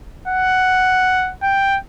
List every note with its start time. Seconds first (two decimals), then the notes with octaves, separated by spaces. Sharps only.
0.28 F#5
1.43 G5